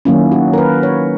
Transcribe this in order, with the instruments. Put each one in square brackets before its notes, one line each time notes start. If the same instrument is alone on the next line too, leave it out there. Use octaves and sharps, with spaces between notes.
[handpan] D#3 F#3 A#3 C#4 E4
F#4
A#4
B4
C#5